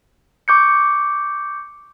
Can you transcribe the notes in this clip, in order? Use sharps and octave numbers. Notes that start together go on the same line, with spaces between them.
C#6 D6 G6 C#7